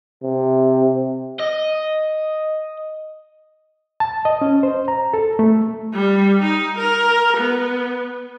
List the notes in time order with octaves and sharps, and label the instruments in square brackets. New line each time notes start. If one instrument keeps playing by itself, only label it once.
[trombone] C3
[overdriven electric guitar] D#5
[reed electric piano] A5
D#5
C#4
C5
A#5
A4
A3
[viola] G3
D#4
A#4
B3